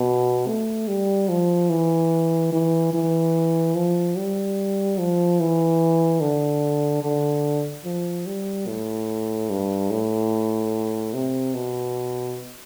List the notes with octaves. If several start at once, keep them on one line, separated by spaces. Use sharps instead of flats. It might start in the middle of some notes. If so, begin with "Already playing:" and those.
Already playing: B2
A3
G3
F3
E3
E3
E3
F3
G3
F3
E3
D3
D3
F3
G3
A2
G2
A2
C3
B2